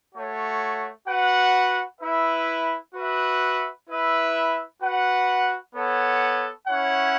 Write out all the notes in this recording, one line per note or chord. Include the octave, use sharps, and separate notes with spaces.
A3 F#4 C#5
F#4 B4 F#5
E4 B4 E5
F#4 B4 E5
E4 B4 E5
F#4 B4 F#5
B3 A4 C#5 F#5
C#4 E4 C#5 F#5